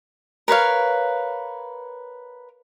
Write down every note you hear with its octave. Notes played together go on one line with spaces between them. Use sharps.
A#4 B4 C#5 F5